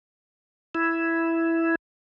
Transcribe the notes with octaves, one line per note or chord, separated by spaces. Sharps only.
E4